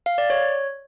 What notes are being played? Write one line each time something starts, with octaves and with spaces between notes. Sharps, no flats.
F5
D5
C#5